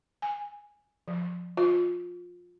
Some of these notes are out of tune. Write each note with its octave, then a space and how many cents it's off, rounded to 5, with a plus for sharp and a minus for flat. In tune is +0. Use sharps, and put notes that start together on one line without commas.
G#5 -5
F3 +15
F4 +20